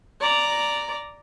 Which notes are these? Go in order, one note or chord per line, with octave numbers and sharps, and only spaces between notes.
D5 A#5